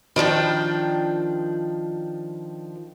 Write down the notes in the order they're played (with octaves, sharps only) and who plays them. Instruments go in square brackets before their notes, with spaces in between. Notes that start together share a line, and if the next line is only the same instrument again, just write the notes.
[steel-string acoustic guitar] D#3 F3 D4 G5